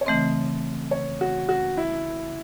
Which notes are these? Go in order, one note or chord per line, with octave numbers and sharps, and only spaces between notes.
C#5
C#3 E3 A3 C4 D#5
C#5
F#4
F#4
E4